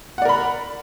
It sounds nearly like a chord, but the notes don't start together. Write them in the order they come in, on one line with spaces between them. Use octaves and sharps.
F#5 D5 A#4 B5